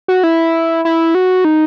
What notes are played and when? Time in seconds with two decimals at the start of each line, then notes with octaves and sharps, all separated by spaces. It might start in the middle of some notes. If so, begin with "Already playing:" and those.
0.08 F#4
0.23 E4
0.85 E4
1.15 F#4
1.45 D#4